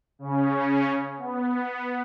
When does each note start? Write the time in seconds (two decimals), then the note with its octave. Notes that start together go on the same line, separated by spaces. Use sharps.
0.19 C#3 C#4
1.18 B3